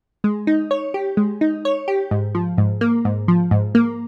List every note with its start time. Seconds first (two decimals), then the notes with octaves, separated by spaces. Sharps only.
0.24 G#3
0.47 D#4
0.71 C#5
0.94 G4
1.17 G#3
1.41 D#4
1.65 C#5
1.88 G4
2.11 G#2
2.35 F3
2.58 G#2
2.81 A#3
3.05 G#2
3.28 F3
3.51 G#2
3.75 A#3